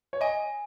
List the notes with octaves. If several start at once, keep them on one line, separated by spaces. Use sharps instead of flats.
C#5
D#5 G#5